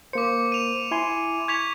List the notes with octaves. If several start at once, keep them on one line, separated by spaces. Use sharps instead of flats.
A#3 C5 D6 C#7
D#7 F7
E4 G#5 C6
C#6 G#6 B6 F7